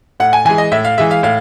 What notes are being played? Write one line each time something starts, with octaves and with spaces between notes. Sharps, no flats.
A2 F#5
G#5
E3 G#3 G#5
D#5
A2 E5
F5
E3 G#3 E5
F5
A2 F5